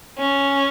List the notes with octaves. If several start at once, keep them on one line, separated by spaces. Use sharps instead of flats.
C#4